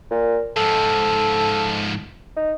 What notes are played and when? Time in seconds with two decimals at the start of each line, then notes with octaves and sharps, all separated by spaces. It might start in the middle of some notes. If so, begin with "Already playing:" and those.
0.11 A#2
0.57 G#2 F3 A4
2.37 D#4